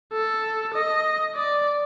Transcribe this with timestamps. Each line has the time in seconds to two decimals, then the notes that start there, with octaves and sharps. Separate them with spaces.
0.13 A4
0.74 D#5
1.35 D5